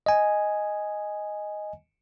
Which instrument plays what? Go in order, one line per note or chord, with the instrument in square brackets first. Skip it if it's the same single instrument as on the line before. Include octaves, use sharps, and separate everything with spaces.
[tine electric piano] D#5 G#5